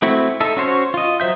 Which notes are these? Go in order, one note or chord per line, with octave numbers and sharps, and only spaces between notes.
A3 C4 E4 F#4
D#4 A4 E5
C#4 F#4 C5 C#5
F4 D#5
F#3 C5 E5 G6